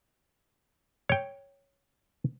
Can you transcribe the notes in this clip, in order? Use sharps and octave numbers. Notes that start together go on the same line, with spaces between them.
C#5 G5